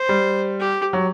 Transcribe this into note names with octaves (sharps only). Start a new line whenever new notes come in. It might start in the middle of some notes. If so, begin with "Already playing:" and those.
Already playing: C5
G3
G4
F#3